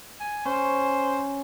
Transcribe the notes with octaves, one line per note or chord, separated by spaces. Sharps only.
G#5
C#4 C5